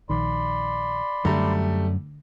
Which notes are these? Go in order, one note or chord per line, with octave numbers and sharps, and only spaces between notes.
A#1 D#3 D5 B5 C6
F#2 D3 G3 A3 A#5